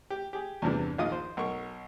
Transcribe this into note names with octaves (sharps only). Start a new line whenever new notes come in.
G4
G4 G#4
E2 G2 C3 E3 D4
A#1 D#3 F4 D#5 D#6
C5
B1 A#4 C#6